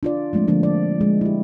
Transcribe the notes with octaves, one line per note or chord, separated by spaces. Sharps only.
D4 F4 D5
F3 G#3 A3 C4 D4
D3 F3 A#3 D4 F4
D5
G#3
E4 G4